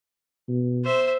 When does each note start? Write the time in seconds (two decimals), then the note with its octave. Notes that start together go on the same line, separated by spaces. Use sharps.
0.49 B2
0.84 C5 E5